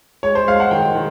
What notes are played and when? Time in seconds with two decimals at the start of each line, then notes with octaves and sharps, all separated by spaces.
0.23 G#3 C#5
0.35 C5
0.47 G#3 F5
0.60 F#5
0.71 D#3 G5
0.95 D#3